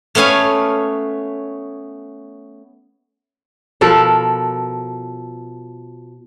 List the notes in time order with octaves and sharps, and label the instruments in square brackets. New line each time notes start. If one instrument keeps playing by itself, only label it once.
[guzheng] A3 B3 C#4 F5 G#5
[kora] B2 F3 A4 A#4